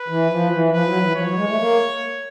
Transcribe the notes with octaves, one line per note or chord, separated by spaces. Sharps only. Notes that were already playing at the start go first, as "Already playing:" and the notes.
Already playing: B4
E3
F3
E3
F3 B4
F#3
E3
F3 C#5
F#3
G#3
A3
A#3